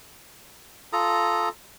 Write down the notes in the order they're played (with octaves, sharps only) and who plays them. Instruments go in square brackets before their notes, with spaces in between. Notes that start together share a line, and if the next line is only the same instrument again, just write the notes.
[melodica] F4 A4 A#5 D#6